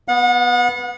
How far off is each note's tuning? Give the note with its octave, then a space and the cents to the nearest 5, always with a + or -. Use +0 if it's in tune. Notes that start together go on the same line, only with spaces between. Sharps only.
B3 +0 F#5 -35